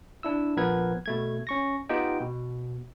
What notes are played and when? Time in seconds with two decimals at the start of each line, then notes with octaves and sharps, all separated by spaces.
0.23 D4 E4 E6
0.57 A#1 F3 B3 A#4 B4 G#6
1.06 B2 A3 G#6
1.47 C#4 C#6 A#6
1.89 B3 D#4 F4 G4 D#5 G5
2.21 B2